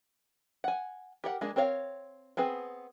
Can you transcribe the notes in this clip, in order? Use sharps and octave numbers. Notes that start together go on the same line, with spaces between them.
F#5 G#5
G4 A#4 F#5
G#3 A#3 D4 G#4
C4 A#4 C#5 D#5 F5
B3 C4 G#4 B4